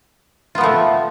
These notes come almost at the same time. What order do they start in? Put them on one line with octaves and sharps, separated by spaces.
F4 B3 F3 A3